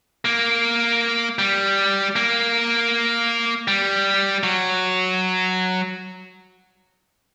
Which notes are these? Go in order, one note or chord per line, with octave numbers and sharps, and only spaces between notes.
A#3
G3
A#3
G3
F#3